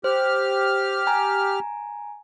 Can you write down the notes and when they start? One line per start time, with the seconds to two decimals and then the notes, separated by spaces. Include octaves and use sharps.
0.04 G4 C5 F6
1.07 G#5 A#5